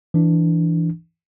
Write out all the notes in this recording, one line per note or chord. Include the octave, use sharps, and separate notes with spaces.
E3 D4